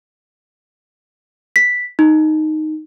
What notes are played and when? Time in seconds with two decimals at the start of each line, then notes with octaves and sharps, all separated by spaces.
1.56 B6
1.99 D#4